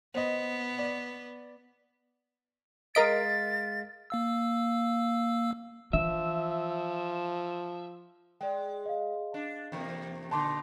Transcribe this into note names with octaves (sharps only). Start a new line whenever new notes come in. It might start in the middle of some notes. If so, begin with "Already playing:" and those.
B3 C5 D#5
D5
G#3 A#4 D#5 F5 A6 B6 D7
A#3 F5 E6
E3 F3 D4 E5
G#3 D5 G5
D#5 F5
D4
E2 C3 A#3
A#2 D3 D#4 A5 C6 D6